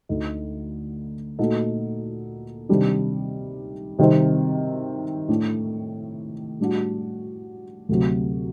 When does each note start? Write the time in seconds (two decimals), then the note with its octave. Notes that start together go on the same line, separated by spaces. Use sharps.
0.09 D2 D3 A3 D#4
1.39 A#2 A3 D#4 F#4 A4
2.69 C3 D#3 G3 D4
3.99 C3 D#3 G3 C4 D#4
5.29 A2 A3 D4
6.60 A2 G3 D4 F#4
7.89 D2 C3 F#3